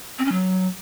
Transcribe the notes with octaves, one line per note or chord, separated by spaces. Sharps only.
C4
C#4
F#3